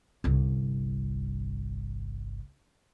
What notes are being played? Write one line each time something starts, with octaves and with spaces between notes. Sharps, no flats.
G1 C2